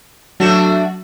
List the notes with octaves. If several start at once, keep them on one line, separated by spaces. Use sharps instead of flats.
F#3 A3 D4 F#4 E7